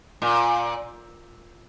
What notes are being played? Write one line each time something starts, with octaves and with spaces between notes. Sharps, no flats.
A#2